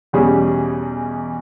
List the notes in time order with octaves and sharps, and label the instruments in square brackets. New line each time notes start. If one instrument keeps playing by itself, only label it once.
[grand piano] E2 B2 G3 C#4 G#4